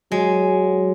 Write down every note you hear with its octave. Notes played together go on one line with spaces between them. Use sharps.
F#3 G#3